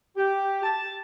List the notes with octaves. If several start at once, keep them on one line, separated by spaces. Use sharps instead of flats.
G4
A5